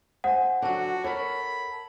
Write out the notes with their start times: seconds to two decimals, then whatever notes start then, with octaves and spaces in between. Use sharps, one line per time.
0.24 C5 F#5 G#5
0.62 D3 F#3 F#4
1.04 A4 A#4 C#5 B5